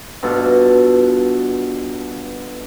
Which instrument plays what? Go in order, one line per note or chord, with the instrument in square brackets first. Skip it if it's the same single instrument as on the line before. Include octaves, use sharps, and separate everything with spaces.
[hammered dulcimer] G2 B2 F4 A4